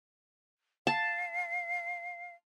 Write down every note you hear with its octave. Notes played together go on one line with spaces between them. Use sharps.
F5 A5